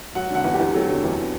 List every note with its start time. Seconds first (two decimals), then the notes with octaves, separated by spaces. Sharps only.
0.15 F#3 F#5
0.31 D3 F#5
0.45 E2
0.54 G4
0.60 E2
0.74 F#3 A4
0.89 D3
1.04 E2